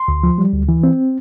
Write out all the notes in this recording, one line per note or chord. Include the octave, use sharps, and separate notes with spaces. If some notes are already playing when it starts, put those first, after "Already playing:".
Already playing: C6
D2
F3
G3
D2
E3
C4